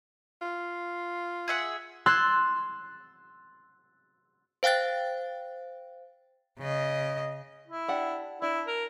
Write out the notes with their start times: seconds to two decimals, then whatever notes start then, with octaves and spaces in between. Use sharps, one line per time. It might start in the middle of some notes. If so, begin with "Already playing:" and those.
0.41 F4
1.48 G#4 E5 F#5
2.06 C6 E6 F#6 G#6 A6
4.63 C5 F5 G5 F#6 A6
6.59 C#3 D#5
7.68 E4
7.88 D4 G4 F#5
8.42 D4 E4
8.68 A#4